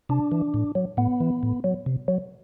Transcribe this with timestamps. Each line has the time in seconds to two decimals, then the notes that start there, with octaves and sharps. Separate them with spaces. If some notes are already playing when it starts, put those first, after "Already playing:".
0.09 C3 D4
0.32 E3
0.54 A2
0.75 F#3
0.97 A2 B3
1.20 E3
1.43 A2
1.64 F#3
1.86 C3
2.08 F#3